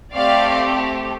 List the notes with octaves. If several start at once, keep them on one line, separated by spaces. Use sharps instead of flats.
A3 C4 G4 D5 F5